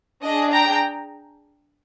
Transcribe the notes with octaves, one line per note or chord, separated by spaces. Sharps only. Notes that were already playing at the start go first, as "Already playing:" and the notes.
D4 G#4 D#5
G5 A#5